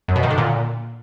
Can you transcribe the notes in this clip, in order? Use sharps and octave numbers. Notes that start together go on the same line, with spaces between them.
F#2
B2
D#3
D3
A#2